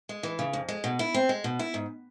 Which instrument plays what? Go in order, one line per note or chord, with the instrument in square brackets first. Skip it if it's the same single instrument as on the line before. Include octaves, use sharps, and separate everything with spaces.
[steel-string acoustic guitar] G#3
E3
C#3
F2
G#3
B2
E4
C4
G#3
B2
E4
G#2